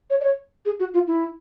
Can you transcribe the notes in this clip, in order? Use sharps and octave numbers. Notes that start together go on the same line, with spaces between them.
C#5
D5
C#5
G#4
F#4
F4
E4